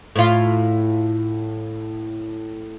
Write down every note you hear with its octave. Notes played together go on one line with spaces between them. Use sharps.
A2 F4